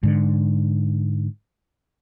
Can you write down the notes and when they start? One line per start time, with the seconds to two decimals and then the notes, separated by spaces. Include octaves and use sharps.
0.03 G#2 D3